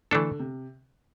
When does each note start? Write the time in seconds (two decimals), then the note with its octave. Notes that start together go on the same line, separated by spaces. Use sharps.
0.11 D3 E3 A3 D4 A4
0.39 C3